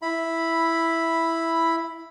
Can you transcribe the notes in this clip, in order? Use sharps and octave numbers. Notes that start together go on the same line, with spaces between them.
E4 B5